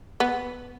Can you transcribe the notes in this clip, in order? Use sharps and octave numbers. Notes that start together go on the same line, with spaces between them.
B3